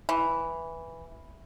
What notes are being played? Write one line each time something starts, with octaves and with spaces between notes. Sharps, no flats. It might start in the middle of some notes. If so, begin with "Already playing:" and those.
E3